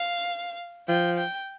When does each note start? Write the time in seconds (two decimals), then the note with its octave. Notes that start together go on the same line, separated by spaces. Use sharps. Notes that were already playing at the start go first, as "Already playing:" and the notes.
Already playing: F5
0.88 F3 G5
1.17 G5